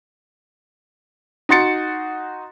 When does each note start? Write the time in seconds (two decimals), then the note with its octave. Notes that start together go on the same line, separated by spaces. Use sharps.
1.49 D#4 F#4 C6 A6 C#7